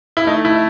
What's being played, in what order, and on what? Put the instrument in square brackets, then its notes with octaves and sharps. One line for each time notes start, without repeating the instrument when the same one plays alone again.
[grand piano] E4
[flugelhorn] A3 [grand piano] D#4
[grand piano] E4